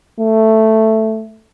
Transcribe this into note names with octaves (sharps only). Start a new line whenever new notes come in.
A3